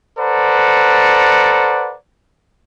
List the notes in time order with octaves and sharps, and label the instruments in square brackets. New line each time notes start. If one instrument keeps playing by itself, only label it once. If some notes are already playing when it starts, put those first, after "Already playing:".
[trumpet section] A4 B4 C5 D5 F#5 A#5